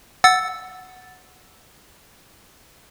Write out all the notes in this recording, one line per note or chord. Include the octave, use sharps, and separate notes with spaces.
F#5 E6 A6